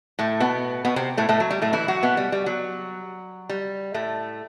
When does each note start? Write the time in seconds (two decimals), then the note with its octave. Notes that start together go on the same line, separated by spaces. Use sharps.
0.19 A2 A3
0.40 B2 B3
0.85 B2 B3
0.96 C3 C4
1.17 A2 A3
1.29 A2 A3
1.40 F#3
1.51 G3
1.62 A2 A3
1.73 E3 E4
1.88 F#3 F#4
2.03 B2 B3
2.17 G3
2.32 G3
2.46 F#3
3.49 G3
3.94 A2 A3